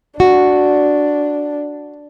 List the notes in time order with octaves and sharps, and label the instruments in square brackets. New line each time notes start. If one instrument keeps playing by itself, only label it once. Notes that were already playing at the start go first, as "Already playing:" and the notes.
[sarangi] D4 [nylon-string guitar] F#4